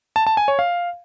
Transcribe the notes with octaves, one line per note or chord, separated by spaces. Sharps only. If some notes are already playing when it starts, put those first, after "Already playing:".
A5
A5
G#5
C#5
F5